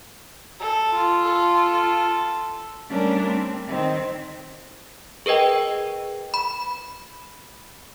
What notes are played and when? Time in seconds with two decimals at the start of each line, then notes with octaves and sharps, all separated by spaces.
0.60 A4
0.91 F4
1.23 A4
2.89 G3 A3 C#4 D4 A#4 D5
3.27 C4
3.67 D#3 C4
5.26 G#4 A#4 B4 D#5 G5
6.34 B5